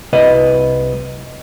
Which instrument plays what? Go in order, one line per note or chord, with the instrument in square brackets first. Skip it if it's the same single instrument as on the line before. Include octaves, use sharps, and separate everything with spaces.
[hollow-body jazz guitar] C2 B4 D#5